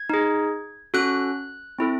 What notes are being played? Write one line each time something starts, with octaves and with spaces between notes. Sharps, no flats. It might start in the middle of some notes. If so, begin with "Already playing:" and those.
Already playing: G#6
D#4 G#4
C#4 F#4 A4 F#6
C4 E4 A4